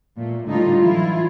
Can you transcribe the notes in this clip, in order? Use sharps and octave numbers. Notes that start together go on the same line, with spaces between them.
A#2 A3
A2 D3 G3 D#4 F4
E3 F#3 E4 F4